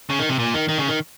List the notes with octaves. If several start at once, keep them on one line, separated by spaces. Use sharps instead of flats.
C#3
D#3
C3
A#2
D#3
D#3
C#3
D#3